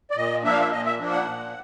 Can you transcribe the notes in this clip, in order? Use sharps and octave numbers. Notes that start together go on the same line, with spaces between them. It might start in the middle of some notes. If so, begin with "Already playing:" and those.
D5
A#2 D#5
F3 A#3 D4 E5
F5
E5
A#2 D#5
E5
F3 A#3 D4
F#5
A#2